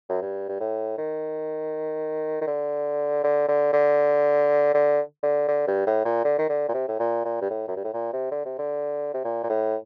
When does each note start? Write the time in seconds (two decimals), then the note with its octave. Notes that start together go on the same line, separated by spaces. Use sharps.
0.09 F#2
0.22 G2
0.49 G2
0.60 A2
0.98 D#3
2.41 D#3
2.47 D3
3.24 D3
3.48 D3
3.73 D3
4.74 D3
5.23 D3
5.48 D3
5.67 G2
5.87 A2
6.05 A#2
6.25 D3
6.38 D#3
6.49 D3
6.68 A#2
6.74 C3
6.88 A2
6.99 A#2
7.25 A#2
7.41 G2
7.50 A2
7.68 F#2
7.76 G2
7.84 A2
7.93 A#2
8.13 C3
8.32 D3
8.45 C3
8.58 D3
9.14 C3
9.24 A#2
9.44 A#2
9.49 A2